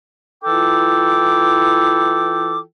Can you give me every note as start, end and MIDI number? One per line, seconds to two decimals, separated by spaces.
0.44 2.60 52
0.44 2.60 64
0.44 2.60 65
0.44 2.60 69
0.44 2.60 79
0.44 2.60 86